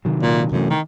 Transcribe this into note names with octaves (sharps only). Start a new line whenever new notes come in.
C3 D#3 F#3
A#2
F#2 C3 E3 A3
D#3